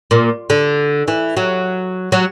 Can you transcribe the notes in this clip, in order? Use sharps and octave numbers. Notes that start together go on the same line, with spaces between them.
A#2
D3
E3
F#3
F#3